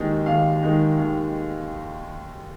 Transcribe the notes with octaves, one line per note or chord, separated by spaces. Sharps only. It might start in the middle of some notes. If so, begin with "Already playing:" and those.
Already playing: D#2 D#3 G#3 D#4
D#2 F5
D#3 G#3 D#4
D#2